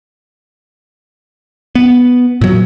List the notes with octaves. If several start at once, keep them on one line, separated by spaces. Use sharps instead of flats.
B3
A#2 F#3